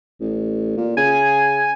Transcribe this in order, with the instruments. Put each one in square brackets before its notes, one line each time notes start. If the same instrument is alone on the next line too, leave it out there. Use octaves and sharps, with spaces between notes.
[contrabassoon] A1
A#2
[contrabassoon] C#3 [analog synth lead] G#5